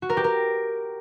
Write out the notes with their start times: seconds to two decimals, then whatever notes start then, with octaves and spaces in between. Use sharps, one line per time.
0.02 F#4
0.10 A#4
0.17 G4
0.24 A#4